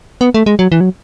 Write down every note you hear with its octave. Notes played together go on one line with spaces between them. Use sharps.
B3
A3
G#3
F#3
E3
F#3